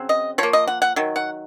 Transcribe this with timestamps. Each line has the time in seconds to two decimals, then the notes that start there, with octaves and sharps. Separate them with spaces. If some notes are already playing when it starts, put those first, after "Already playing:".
Already playing: C#3 F#3 C4
0.09 D#5
0.38 F3 A#3 C#5
0.53 D#5
0.67 F#5
0.82 F#5
0.96 D#3 F#3
1.16 F#5